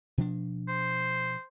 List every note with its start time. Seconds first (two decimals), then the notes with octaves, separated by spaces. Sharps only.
0.18 B2 F3 D4
0.68 C5